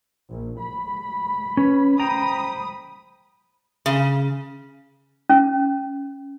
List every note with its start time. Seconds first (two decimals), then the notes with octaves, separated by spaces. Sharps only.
0.30 A#1
0.59 B5
1.57 C#4 B4
2.00 C5 G5 A#5 B5 D#6
3.86 C#3
5.29 C#4